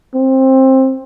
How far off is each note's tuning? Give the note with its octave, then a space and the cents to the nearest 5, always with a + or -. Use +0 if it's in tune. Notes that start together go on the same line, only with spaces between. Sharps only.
C4 +15